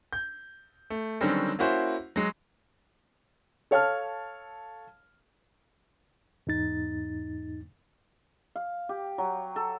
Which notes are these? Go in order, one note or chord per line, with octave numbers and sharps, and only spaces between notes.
G6
A3
D3 D#3 F#3 G3 C4 C#4
A#3 C#4 E4 F#4 C5
F#3 G#3
A4 C#5 F5 A5 F6
E2 G#2 D#4 A6
F5
G4
F#3
A4